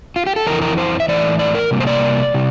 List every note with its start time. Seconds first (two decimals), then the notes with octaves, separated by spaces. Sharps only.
0.16 F4
0.27 G4
0.36 A4
0.46 F2 E3 A#4
0.62 A#4
0.78 C5
1.00 E5
1.08 A2 E3 A3 D5
1.39 D5
1.55 A#4
1.71 C3 G3 A#3
1.80 C5
1.87 D5
2.34 C3 G3